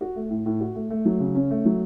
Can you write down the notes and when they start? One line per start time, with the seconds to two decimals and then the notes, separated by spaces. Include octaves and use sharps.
0.01 F#4
0.16 A3
0.30 A2
0.46 A2
0.60 F#4
0.75 A3
0.90 A3
1.05 F#3
1.20 C#3
1.35 C#4
1.51 A3
1.65 F#3